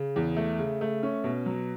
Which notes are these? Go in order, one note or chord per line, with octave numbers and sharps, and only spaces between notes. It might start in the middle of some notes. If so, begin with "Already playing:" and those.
Already playing: C#3
E2
A3
C#3
A3
C#4
B2
F#3